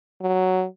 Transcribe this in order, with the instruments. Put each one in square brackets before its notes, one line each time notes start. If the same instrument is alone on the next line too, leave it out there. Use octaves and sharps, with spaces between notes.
[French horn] F#3